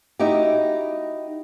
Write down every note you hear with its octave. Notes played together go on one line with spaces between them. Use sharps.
D#4 E4 F#4 G4